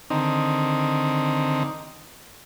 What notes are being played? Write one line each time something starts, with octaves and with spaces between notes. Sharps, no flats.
D3 D#3 C4 D#4